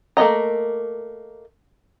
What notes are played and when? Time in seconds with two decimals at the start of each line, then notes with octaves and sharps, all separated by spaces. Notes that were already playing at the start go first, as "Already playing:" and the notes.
0.17 A3 A#3 C#4 D#5 A#5